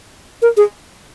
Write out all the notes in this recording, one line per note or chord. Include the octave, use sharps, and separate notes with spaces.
A#4
G#4